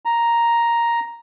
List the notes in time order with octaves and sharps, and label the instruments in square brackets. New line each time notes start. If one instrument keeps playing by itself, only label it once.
[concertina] A#5